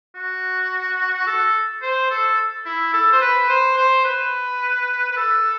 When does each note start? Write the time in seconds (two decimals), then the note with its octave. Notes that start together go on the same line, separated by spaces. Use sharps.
0.15 F#4
1.27 A4
1.82 C5
2.10 A4
2.66 E4
2.93 A4
3.12 C5
3.21 B4
3.49 C5
3.77 C5
4.05 B4
5.11 B4
5.16 A4